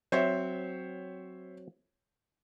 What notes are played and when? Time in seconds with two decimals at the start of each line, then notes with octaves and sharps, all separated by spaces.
0.12 F#3 C4 C5 C#5 E5